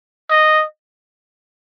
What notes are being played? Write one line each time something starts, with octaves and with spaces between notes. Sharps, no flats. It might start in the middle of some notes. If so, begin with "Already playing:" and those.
D#5